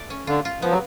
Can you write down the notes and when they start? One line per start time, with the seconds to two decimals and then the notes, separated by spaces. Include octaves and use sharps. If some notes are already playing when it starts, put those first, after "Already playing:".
Already playing: A3 D5
0.10 C#4
0.27 D3 F4
0.45 F4
0.62 F3 B3
0.71 F#3